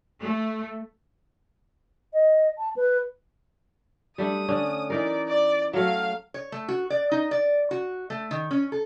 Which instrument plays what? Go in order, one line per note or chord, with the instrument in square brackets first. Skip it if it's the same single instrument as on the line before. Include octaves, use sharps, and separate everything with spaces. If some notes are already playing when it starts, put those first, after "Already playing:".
[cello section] A3
[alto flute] D#5
A5
B4
[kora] G3 A3 D4 [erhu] D#6
[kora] D3 C#4 D4
[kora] E3 D#4 A#4 [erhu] D5
[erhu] D5
[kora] F#3 A3 [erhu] F5
[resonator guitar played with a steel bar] C#5
A3
F#4
D5
D#4
D5
F#4
A3
D#3
C#4
A4